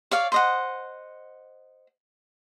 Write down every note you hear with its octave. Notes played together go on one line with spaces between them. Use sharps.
C#5 D5 F5
C5 D#5 F#5